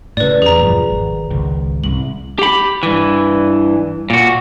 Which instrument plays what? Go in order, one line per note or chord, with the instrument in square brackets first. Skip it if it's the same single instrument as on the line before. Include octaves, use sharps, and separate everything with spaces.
[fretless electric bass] A2 C#3 [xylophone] B4 D5
[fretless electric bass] E2 [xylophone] G#4 A#5
[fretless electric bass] E1 G2 F3
G#1
G#1 C#2
[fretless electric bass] C2 [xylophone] F#7
[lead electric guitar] G4 B5
G2 E3
A#2 F#4